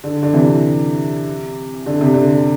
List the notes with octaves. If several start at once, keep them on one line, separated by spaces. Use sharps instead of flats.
D3
D3
C3 E3
D3
C3
D3